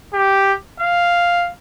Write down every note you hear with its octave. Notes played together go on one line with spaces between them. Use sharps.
G4
F5